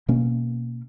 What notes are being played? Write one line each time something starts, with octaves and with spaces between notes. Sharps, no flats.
B2 A#3 C#4